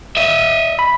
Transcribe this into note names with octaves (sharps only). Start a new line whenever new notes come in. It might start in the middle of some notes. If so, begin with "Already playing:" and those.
D#5 E5
B5